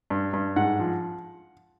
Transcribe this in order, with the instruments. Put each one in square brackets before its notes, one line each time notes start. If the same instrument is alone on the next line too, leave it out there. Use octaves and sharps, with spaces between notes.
[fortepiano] G2
G2
G#2 F#5
F3